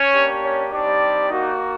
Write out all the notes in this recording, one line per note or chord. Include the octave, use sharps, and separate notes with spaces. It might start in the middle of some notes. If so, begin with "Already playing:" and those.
Already playing: C#4 C#5
A#3 D4 G4
C#4 C#5
G3 C4 D4 D#4 G4 D5
A#3 D#4 F#4